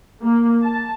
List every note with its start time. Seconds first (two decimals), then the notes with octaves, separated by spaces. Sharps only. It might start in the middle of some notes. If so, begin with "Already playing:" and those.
0.23 A#3
0.63 A5